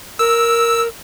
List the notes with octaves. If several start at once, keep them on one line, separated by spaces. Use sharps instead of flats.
A#4 E6